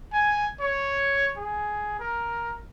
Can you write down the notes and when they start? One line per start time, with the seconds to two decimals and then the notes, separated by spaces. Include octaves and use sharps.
0.13 G#5
0.60 C#5
1.37 G#4
1.99 A#4